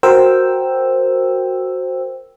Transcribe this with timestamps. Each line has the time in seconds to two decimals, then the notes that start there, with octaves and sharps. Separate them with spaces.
0.03 F#4 A#4 C5 G5 E6